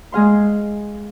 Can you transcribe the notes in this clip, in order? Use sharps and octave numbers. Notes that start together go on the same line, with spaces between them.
G#3 G#4 F5 C6